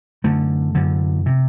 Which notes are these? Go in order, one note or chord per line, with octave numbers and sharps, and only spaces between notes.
F#2 D3 A3
F#2 D3
C3